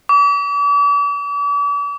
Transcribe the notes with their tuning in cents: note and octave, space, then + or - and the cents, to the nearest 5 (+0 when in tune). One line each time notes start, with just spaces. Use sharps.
D6 -45